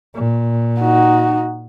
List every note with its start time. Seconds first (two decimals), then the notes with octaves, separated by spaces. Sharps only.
0.14 A#2
0.80 D#4 F#4